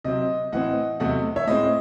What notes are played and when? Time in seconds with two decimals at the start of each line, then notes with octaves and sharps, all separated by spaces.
0.04 C3 F#3 C4 D#5
0.52 A2 E3 C4 D#5 F#5
1.00 E2 C3 F#3 A3 D#5 F#5
1.36 C#5 E5
1.47 A2 G#3 C4 D#5